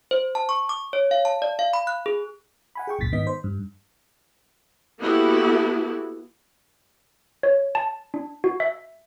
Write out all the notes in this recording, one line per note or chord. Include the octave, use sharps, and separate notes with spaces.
C5
A5
C#6
D6
C#5
F5
A5
D5
F5
B5
F#6
G#4
F#5 G#5 B5
G#4 G5 C#6
G#1 C#2 F#2 A#2 A6 B6
G#2 D#3 B3 D#5 B6
C5
G2
A#3 B3 E4 F#4 G4 A4
C#5
A5
D4
F#4
E5